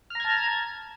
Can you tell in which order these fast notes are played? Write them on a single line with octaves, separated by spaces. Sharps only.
F6 A#5 G#6 A5